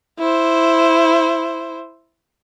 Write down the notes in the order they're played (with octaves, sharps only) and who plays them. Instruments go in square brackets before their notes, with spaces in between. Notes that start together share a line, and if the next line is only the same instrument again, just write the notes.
[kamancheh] E4 C5